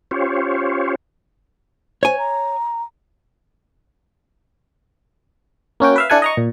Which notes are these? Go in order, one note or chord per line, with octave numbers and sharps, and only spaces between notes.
C#4 F4 G4 C5 C#5
C5 C#5 G#5
A#5
A#3 C#4 F#4 G5
B4 E5 F5
D4 E4 A4 F#5 G#5
D#5 A#5 C#6
A#2